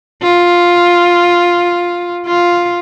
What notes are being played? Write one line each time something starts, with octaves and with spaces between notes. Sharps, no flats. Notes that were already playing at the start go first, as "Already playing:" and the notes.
F4
F4